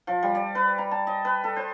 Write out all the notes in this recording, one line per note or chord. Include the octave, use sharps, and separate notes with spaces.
F3
G3
D5
B4
A#5
A5
D#5
B4
A4
C5